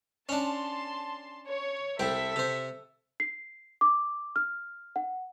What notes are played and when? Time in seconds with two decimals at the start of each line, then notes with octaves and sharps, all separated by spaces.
0.29 C#4 D4 A5 C6
1.46 C#5
1.99 C2 C4 A4 E5 G5 B6
2.36 C3 C5
3.20 C7
3.81 D6
4.36 F6
4.96 F#5